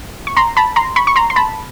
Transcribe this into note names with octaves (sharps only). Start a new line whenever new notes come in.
C#6
A#5 C6
A5 B5
A#5 C6
B5 C#6
C#6
A#5 C6
C6
A5 B5